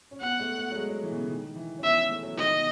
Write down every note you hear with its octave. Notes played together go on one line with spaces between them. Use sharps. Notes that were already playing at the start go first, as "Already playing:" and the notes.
C#4
B3 F#5
A3
A3
F#3
G#3
F#3
E3
B2
C#3
D#3
E3
C#4
B3 E5
C#4
A3
F#3
D#3 D#5
B2